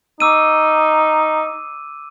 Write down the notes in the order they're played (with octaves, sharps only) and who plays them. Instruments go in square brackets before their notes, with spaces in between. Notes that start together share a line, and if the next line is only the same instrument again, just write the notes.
[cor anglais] D#4 [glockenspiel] D6 E6 D#7